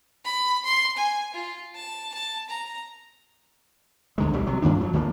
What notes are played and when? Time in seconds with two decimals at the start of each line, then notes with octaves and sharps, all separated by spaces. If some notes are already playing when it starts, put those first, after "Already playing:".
0.25 B5
0.65 C6
0.97 G#5
1.34 F4
1.75 A5
2.14 A5
2.49 A#5
4.18 D2 D3 G#3
4.33 B1 F#3 G3
4.47 C3 F#3
4.62 G2 A#2 D#3 D4
4.76 F3 F#3
4.93 D2 F3 F#3 A#3